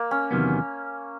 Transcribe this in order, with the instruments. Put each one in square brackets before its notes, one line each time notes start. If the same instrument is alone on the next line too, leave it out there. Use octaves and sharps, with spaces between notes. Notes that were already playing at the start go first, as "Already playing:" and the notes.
Already playing: [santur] A#3
C#4
[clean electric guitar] E2 C3 D#3 F#3 B3